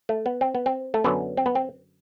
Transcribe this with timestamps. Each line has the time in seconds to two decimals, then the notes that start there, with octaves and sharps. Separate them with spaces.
0.09 A3
0.26 B3
0.41 C4
0.55 B3
0.66 C4
0.94 A3
1.04 F#2 D3 F#3 B3
1.37 C4
1.46 B3
1.55 C4